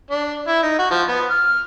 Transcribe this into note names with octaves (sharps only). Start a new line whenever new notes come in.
D4
E4
D#4
F#4
F3
B3
F6